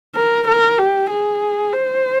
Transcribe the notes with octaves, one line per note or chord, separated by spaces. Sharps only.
A#4
A#4
G4
G#4
C5